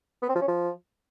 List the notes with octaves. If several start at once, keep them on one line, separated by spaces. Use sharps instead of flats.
B3
C4
F3
C#4
F3